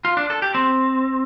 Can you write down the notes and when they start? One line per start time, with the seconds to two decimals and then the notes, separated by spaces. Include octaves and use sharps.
0.05 F4
0.17 D4
0.30 A4
0.42 G4
0.55 C4